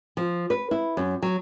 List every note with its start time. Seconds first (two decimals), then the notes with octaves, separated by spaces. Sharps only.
0.17 F3
0.50 B4
0.71 E4
0.97 F#2
1.22 F#3